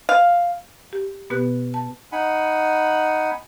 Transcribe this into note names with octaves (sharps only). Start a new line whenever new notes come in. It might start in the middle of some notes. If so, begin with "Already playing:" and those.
F5
G4
B2 B3 G4 B4 F#6
A5
D#4 F#5 G#5 B5